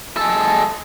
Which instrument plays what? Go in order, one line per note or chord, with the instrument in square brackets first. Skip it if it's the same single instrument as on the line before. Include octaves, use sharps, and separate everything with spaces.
[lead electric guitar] G#3 A4